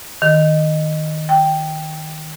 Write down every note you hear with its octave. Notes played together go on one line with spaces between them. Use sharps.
D#3
G5